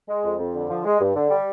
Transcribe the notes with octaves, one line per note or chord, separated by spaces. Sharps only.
G#3
F2
F2
D3
F3
G#3
G2
D3
G3